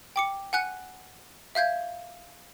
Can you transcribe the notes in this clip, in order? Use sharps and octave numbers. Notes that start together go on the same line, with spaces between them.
G5 D6 C#7
F#5 G#5 F#6 C#7
E5 F5 G6 G#6